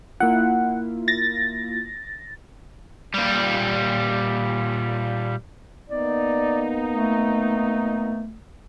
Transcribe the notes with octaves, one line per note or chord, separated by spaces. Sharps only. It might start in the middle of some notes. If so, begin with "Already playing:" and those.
A#3 E4 F4 F#5
A6 A#6
A#2 G3
A#3 B3 D#4 D5
A3